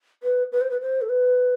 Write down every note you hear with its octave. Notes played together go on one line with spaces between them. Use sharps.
B4
B4
C5
B4
C5
A4
B4